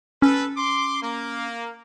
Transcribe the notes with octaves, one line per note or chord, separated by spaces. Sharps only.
C#4 A4 B4
C6 D6
A#3